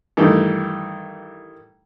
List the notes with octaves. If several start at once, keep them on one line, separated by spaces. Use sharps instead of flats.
G2 D#3 E3 A3